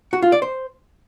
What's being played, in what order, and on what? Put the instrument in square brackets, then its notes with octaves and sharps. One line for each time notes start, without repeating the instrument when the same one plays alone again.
[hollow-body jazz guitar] F#4
F4
D5
C5